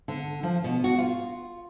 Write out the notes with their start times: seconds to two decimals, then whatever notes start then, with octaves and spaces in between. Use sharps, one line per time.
0.08 D3
0.43 F3
0.64 B2
0.84 F#4
0.98 F4